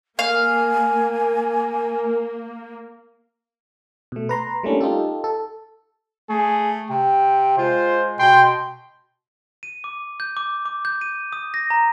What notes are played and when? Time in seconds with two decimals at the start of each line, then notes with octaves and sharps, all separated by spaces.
0.19 A#3 A#4 F5 G#5
4.12 B2 A3
4.29 B4 A#5 C6
4.63 G3 A3 A#3 C#4 D4 E4
4.81 D#4 F4 G4 A4
5.24 A4
6.29 A3 G#4
6.90 C3 G5
7.58 G#3 F4 C5
8.19 B2 G5 C6
9.63 D#7
9.84 D6
10.20 G6
10.37 D6
10.65 D6
10.85 G6
11.01 D#7
11.33 D#6
11.54 A#6
11.70 A#5